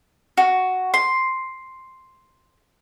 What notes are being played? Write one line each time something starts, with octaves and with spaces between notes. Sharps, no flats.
F#4
C6